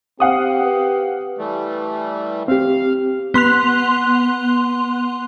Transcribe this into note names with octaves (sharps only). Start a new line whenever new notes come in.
C4 G4 F5 F#5 D#6
B4
E3 G3 A3
C4 G4 F5
B3 C6 F#6 F7